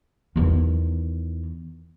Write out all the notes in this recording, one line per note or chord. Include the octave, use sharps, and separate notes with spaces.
E2 D#3